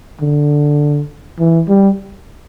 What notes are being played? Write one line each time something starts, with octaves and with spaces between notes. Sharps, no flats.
D3
E3
G3